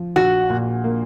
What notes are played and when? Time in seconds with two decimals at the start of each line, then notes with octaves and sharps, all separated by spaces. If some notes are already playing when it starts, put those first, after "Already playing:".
Already playing: F3
0.16 A#1 F#4
0.50 A#2
0.84 A#3